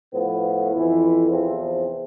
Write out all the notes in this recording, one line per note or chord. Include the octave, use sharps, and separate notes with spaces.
A2 F3 B3
F2 E3 B3 E4
E2 C3 F3 C4